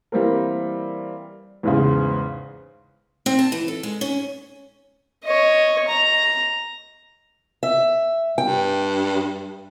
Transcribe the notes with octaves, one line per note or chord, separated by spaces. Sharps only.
E3 G3 A#3 C4 A#4
E2 G#2 C#3
C4
A5
E3
A4
G#3
C#4
C#5 D#5
A#5
E5
G2 G5